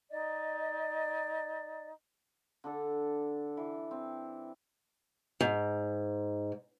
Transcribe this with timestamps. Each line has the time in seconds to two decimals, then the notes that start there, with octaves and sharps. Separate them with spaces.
0.11 D#4 D5 D#5
2.64 D3 D4 A4
3.57 E3
3.91 C4
5.41 G#2